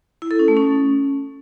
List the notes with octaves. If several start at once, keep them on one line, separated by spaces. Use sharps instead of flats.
E4
A4
C#4
A3
C#4